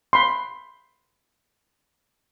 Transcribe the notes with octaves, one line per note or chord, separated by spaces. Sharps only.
B5 C6